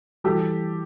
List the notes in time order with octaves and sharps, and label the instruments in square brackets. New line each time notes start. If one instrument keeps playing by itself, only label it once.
[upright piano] E3 G3 G4 A4